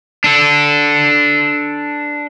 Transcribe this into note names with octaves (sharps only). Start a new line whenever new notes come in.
D4 A4